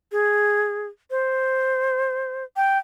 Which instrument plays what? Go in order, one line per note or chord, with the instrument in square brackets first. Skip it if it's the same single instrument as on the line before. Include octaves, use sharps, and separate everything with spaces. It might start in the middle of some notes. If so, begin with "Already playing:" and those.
[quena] G#4
C5
G5